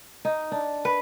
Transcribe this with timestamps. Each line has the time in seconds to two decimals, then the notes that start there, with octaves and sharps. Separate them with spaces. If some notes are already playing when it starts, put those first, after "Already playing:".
0.25 D#4
0.52 D4
0.85 B4